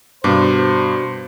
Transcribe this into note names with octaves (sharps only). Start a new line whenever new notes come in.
G2 B2 C5 D6